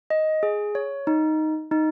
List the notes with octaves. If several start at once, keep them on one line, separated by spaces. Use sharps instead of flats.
D#5
G#4
C#5
D#4
D#4